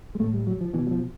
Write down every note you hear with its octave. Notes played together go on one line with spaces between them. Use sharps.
G#3
A2 A3
G3
F#3
F3
B2 E3
F#3
F3